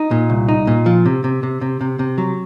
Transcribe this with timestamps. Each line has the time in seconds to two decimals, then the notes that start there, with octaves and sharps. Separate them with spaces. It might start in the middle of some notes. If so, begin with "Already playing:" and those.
Already playing: D#4
0.11 A#2
0.30 C2
0.49 D#4
0.67 A#2
0.86 F3
1.06 C3
1.24 C3
1.43 C3
1.61 C3
1.81 C3
1.99 C3
2.18 F#3